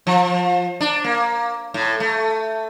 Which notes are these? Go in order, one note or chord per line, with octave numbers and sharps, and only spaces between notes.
F3
D4
A#3
A2
A3